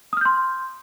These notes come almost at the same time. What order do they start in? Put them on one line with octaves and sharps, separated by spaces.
D#6 F6 G6 C6